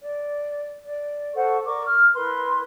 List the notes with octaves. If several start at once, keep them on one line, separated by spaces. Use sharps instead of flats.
D5
D5
A4 C5 F#5 C#6
A#4 D5 C#6 D6
F6
E4 A#4 B4 C6